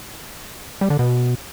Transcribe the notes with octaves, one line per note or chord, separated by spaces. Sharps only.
G3
D3
B2